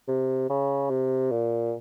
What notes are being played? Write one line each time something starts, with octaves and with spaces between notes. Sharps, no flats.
C3
C#3
C3
A#2